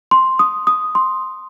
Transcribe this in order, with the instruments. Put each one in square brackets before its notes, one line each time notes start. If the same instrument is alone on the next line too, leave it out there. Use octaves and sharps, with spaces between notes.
[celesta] C6
D#6
D#6
C6